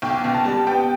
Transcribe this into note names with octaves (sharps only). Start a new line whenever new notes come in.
B1 G5
B2
A5
G3
B3 G5